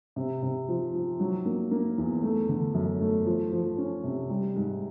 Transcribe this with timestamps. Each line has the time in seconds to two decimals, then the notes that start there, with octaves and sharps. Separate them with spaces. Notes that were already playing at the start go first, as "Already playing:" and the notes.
0.16 C3
0.43 C3
0.69 F3
0.94 F3
1.20 F#3
1.45 A#3
1.71 A#3
1.98 E2
2.23 A3
2.49 D3
2.74 F#2
3.01 A3
3.26 F3
3.52 F3
3.78 C#4
4.04 C3
4.30 G3
4.56 G#2